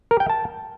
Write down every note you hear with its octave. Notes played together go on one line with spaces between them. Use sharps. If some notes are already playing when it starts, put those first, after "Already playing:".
A#4
G5
A5